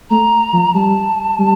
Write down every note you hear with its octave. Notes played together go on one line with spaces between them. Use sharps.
A3 A#5
F3
G3 A5
G3